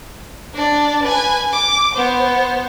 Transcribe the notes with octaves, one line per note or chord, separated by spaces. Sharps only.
D4 D5
B4 G#5
D6
B3 C5